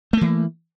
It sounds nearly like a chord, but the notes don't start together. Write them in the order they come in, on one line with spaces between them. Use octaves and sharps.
A3 A#3 E3